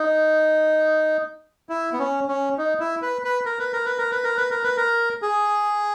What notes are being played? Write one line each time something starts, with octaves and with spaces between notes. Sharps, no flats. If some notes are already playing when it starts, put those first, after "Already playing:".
Already playing: D#4
E4
B3
C#4
C#4
D#4
E4
B4
B4
A#4
B4
A#4
B4
A#4
B4
A#4
B4
A#4
B4
A#4
G#4